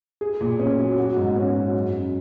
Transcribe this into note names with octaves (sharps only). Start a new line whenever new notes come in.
G#4
A#2
C#4
F#3
F#4
G#2
C#4
F#3
F#2
F#2